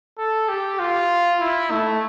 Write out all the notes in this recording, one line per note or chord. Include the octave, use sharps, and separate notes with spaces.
A4
G4
F4
E4
A3